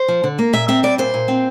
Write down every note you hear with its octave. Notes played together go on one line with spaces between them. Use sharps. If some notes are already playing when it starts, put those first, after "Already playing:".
Already playing: C5
F3
D3
A#3
A#2 E5
C4 E5
G3 D5
A#2 C5
A#2
C4